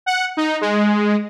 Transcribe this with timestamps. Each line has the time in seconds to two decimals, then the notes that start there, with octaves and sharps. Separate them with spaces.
0.06 F#5
0.37 D#4
0.61 G#3